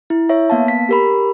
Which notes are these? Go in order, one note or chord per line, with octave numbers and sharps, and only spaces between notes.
E4
C#5 E5
A#3 B3 F5 A5
B6
G4 A#4 B5